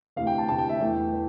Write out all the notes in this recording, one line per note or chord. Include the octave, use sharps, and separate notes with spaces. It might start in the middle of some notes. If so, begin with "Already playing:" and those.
D2 C3 E3 F5
G5
A5
D2 C3 E3 A5
G5
E5
E2 E3 A3 G5
E3